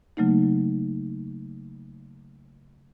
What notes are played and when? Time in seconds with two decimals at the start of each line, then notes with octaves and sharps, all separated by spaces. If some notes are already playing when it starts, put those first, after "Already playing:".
0.17 C#3 F#3 A3 A#3 D#4